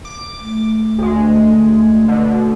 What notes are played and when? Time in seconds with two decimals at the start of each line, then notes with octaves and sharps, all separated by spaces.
0.05 D6
0.41 A3
0.99 D2 G#3
2.08 B2 D3